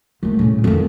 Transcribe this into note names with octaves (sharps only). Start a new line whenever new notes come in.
D#3 A3
A2 C#3
F2 D#3